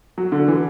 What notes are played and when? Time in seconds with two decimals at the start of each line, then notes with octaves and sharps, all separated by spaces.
0.18 F#3
0.32 D3
0.48 E3